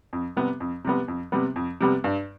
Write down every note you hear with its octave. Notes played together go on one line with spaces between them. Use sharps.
F2
C3 G3 B3
F2
C3 G3 B3
F2
C3 G3 B3
F2
C3 G3 B3
G2